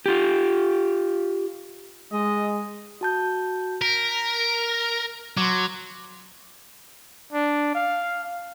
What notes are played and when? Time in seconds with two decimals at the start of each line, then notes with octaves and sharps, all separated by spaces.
0.06 F4 G4
2.13 G#3 D#5
3.01 F#4 A5 G6
3.82 A#4 B6
5.37 F#3 C6 D6
7.33 D4
7.75 F5